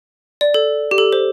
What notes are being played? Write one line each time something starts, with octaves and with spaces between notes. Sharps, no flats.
D5
A4
G4
A4
C5